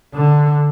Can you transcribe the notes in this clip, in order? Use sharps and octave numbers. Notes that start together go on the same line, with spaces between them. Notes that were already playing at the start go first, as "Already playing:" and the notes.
D3